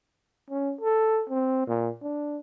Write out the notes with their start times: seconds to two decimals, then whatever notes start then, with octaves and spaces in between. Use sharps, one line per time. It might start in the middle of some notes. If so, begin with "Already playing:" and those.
0.51 C#4
0.81 A4
1.29 C4
1.67 A#2
2.03 D4